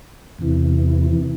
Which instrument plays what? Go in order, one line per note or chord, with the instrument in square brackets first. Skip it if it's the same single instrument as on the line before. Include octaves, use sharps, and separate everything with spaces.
[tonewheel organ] E2 C3 E3